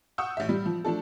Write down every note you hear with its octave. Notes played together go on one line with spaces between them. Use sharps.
F#5 C#6 D#6 E6 G6
A1 E5
G3
F3
F3 A3 D4 A4